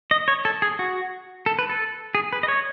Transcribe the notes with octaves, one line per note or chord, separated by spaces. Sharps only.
D#5
C#5
A4
G#4
F#4
A4
B4
A4
G#4
B4
D#5
C#5